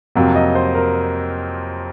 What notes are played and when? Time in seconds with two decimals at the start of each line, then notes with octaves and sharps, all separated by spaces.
0.15 F2 C3 F#3 A#3
0.35 D#5
0.55 C5
0.75 A#4